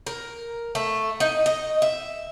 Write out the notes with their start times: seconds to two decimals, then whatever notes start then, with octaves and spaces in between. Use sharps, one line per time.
0.07 A#4
0.75 A3
1.20 D#4
1.46 D#5
1.82 E5